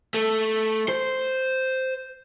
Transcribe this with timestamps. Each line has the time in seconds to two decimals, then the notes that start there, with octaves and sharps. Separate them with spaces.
0.14 A3
0.89 C5